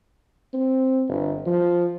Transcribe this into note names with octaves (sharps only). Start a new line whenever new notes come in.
C4
G1
F3